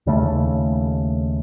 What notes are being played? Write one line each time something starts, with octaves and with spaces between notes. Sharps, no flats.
D#2 C#3 A3